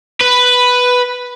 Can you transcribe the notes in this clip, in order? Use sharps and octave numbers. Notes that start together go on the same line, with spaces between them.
B4